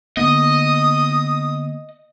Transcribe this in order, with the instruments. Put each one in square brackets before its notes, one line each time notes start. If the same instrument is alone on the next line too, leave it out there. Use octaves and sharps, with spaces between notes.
[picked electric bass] D3 A#3 B3 [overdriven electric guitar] D#5 [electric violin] D#6